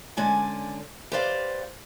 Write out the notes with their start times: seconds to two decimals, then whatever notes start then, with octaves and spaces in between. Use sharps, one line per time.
0.17 D3 G#3 C#4 D5 G#5
1.12 G4 B4 C5 D5 E5 F5